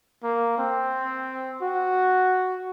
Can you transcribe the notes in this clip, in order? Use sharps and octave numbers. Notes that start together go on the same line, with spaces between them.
A#3
C4
F#4